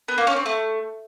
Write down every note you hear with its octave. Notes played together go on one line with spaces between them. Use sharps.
B3
A#3
C#4
C4
A3